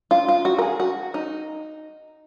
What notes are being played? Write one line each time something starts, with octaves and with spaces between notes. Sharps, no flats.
F4
F4
F#4
A#4
G#4
F#4
D#4